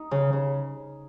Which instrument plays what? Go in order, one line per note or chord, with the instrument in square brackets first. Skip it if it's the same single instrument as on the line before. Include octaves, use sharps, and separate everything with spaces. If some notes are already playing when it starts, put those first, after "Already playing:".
Already playing: [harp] D#4
C#3
C#3